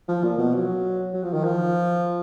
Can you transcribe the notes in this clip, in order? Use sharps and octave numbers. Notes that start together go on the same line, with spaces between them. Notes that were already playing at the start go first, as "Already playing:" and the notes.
F3
A#2
B2
F#3
F#3
F3
D#3
F3